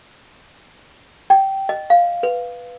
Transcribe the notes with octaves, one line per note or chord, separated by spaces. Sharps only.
G5
D#5
F5
B4